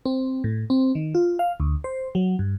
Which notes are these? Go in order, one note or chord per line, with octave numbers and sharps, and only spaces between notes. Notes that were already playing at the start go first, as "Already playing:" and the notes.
C4
A2
C4
D#3
F4
F5
D2
C5
F#3
G2